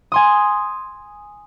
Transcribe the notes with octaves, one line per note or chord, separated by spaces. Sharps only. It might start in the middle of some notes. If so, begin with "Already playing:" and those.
G#5 C6 D#6